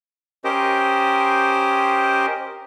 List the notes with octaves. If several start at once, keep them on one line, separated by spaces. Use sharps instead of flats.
C#4 G4 A#4 C5 D#5